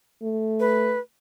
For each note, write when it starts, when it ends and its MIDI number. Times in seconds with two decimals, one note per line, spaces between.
0.23 0.97 57
0.60 0.99 71